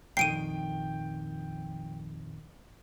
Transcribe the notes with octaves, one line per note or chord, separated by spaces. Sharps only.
A#1 F2 D#3 G5 C7 D7 D#7